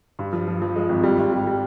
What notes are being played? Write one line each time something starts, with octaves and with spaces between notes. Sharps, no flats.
G2
F3
F3
F3
G#3
G#1
G3
G#1
G3
G3